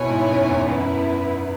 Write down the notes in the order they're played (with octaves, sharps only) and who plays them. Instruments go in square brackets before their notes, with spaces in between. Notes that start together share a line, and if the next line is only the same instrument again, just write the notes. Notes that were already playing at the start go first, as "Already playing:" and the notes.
Already playing: [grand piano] B2 [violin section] E4 C#5 G#5
[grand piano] G#2
F#2
E2
[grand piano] F#2 [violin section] B3 E4 B4